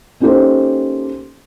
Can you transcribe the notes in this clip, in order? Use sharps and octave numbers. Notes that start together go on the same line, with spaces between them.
A#3 C#4 D#4 G4 A4 C5